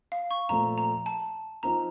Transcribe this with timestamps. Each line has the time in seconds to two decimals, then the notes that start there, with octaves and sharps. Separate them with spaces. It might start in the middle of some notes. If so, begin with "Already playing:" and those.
0.12 F5
0.31 C#6
0.49 A#2 F3 A3 C4 A#5
0.78 A#5
1.06 A5
1.63 F3 C4 D#4 A#4 A#5